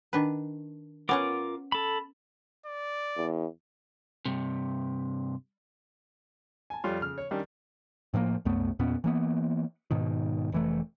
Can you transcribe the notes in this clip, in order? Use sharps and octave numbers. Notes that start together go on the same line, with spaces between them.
D#3 D4 B4
B3 C#4 F4 A#4 F#5 D6
A4 B5
D5
E2
G2 C3
G#5 A5
F2 G3 F4 C#5
C#3 F6
C#5
D#3 G3 C#4 D4
A2 F3 A3 A#3
C2 F#2 A3 B3
E2 A#2 B3 C#4
E3 A#3 B3
G#2 B2 D#3
F1 E3 A3